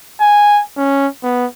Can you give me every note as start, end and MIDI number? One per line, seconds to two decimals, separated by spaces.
0.20 0.62 80
0.77 1.07 61
1.23 1.46 59